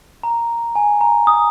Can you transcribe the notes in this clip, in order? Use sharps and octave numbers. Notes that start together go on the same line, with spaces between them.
A#5
G#5
A#5
D#6